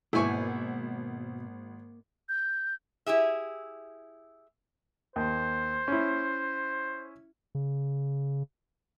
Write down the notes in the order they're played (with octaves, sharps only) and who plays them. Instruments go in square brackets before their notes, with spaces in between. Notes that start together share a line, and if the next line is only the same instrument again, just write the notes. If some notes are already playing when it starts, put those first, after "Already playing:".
[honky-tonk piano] G#1 [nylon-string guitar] B2 G#5 [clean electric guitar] A#3 [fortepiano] E4 C#6
[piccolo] G6
[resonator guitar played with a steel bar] E4 G4 G#4 E5
[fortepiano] D#2 [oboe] C5
[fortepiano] C#4 E4
[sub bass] C#3